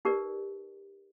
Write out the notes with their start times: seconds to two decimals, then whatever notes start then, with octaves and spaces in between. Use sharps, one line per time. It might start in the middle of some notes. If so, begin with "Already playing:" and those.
0.05 D#4 G4 A#4 B4 D5